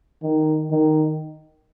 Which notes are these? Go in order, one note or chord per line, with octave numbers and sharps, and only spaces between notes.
D#3
D#3